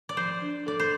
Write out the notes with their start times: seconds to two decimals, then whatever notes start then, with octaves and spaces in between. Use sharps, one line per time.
0.09 D5
0.17 F3 C5
0.42 D4
0.66 A4 D5
0.80 C5